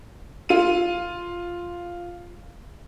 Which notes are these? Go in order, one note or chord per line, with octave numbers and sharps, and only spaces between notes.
F4 D#7